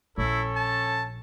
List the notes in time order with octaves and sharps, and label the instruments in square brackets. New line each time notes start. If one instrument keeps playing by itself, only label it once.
[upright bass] A#1 [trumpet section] C#4 A4 C#5 [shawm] E4
[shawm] A5